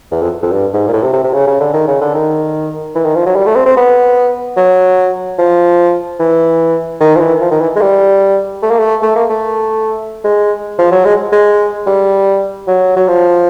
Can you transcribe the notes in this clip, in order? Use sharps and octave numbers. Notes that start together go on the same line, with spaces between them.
E2
F2
F2
G2
G#2
A#2
A2
C3
C3
C3
C#3
C#3
D3
D#3
C#3
D3
D#3
E3
D#3
F3
F#3
G3
A3
C4
C4
B3
F#3
F3
E3
D#3
F3
E3
F3
D#3
E3
G#3
G3
A3
A#3
A3
A3
A#3
A3
G#3
F3
F#3
G#3
G#3
G3
F#3
F#3
F3